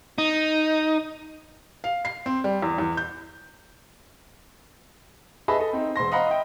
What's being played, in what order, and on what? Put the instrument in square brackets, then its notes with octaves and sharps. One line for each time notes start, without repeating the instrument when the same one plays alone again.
[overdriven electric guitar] D#4
[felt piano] F5
C7
C4
G3
E2
E2
G6
[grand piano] G#4 B4 D#5 E5 A5 B5
A4 D#5
C4 D#4
E1 C5 C6 A#6
D#5 F5 F#5 A#5 B5
D#5 E5 G5